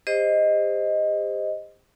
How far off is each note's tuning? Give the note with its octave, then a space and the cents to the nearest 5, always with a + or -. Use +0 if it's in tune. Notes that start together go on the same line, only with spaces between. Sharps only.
G4 +40 C5 +0 D#5 +0